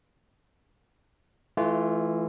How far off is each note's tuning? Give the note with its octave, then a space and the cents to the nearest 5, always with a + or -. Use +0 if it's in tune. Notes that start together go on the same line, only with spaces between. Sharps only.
E3 +0 A3 -30 F4 -15